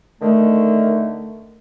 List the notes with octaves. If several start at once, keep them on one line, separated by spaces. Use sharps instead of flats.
D3 D#3 A3